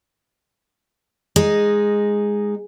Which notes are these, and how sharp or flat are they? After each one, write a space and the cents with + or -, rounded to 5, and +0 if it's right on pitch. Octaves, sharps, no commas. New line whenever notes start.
G#3 -5 D#4 +0